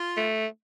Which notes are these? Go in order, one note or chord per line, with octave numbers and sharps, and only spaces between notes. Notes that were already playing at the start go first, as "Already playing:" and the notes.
Already playing: F4
A3